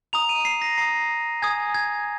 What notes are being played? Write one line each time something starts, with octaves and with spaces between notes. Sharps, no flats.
A#5 D#6 F7
D#7
C7
A#6
A#5 D#6 C7
G#5 D#6 G#6
G#6